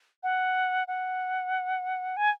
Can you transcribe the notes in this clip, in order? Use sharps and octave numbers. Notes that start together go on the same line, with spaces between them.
F#5
F#5
G#5